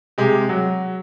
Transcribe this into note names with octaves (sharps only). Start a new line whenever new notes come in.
C3 G#3 G4
F#3